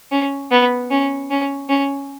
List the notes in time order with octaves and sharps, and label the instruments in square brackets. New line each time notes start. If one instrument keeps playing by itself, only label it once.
[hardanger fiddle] C#4
B3
C#4
C#4
C#4